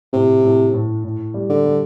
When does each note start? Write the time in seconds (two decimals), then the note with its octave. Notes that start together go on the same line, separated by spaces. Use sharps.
0.13 A2 C3
0.44 A2
0.74 A2
1.04 A2
1.34 G3
1.50 D3
1.65 G3